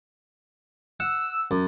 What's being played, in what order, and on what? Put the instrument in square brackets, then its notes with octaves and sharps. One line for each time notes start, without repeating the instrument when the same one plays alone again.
[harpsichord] F#5 [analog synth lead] E6
[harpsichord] F#2